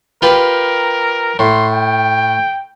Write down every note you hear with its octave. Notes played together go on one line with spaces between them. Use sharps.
F4 G4 A#4 B4
A2 C6
G5